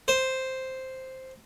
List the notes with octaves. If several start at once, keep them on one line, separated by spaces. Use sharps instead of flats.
C5